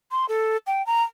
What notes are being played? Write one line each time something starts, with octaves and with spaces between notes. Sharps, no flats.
C6
A4
G5
A#5